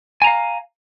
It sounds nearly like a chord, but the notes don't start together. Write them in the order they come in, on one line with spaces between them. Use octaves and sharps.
G#5 A#5 F5